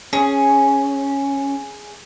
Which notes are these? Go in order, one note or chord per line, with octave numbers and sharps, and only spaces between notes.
C#4 G#4